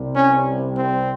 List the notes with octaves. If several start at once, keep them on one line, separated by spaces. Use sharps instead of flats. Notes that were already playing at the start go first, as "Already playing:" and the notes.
Already playing: C2 C3 G3
C#4
C4